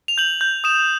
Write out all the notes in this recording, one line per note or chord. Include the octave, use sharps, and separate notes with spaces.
F7
G6 F#7
G6
D#6 E7